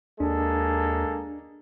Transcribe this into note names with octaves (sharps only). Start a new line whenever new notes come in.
D#2 G#3 A#3 D4 A4